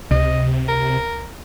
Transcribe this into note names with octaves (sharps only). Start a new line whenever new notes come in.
C#2 C3 D#5
A#4